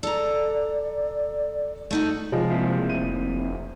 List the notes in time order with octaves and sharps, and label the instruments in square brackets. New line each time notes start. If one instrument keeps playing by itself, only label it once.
[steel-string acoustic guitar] A4 A#5 [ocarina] D5
[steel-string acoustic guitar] A3 D#4 F#4
[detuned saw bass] C3 [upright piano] F3 G#3
[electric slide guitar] A#3 C4 E4
[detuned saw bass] F1 [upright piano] D#7